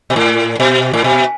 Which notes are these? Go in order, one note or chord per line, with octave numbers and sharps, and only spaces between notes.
B2
A2
B2
A2
B2